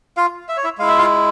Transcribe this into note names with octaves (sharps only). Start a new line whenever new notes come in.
F4 F5
E5
C#5
E4 E5
G#3 E4 F5
E5
F4 F5